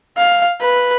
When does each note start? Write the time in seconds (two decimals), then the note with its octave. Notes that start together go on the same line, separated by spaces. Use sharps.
0.17 F5
0.61 B4